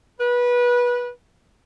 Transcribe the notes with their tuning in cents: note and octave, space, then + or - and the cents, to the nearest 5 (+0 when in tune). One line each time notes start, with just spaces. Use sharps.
B4 -20